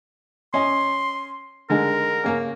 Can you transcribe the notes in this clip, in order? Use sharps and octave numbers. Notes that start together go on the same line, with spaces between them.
C#4 D#5 C6
D3 G#3 D#4 A#4
C#3 A#3 C#4